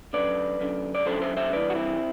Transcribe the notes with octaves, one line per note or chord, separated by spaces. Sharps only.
F#2 D3 B4 D5
F#2 D3
D5
F#2 D3 A4 C5
C5 E5
C5 E5
G2 E3 B4 D5
F#4
C4 E4